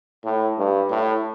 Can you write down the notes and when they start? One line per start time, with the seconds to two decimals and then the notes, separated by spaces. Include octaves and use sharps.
0.24 A2
0.59 G2
0.91 A2